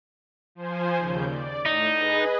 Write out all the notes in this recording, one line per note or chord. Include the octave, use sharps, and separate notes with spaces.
F3 C5 G#5
D#2 C#3 G6
D5
A2 D#4
G#4 B4 D#5